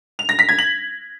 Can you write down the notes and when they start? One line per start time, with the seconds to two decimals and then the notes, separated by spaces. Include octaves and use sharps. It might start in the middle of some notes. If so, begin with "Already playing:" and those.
0.19 F7
0.29 A#6
0.39 B6
0.49 G#6
0.59 F#7